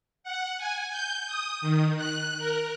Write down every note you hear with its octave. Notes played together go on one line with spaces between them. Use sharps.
F#5
G#5
G6
D#6
D#3
F#6
A#4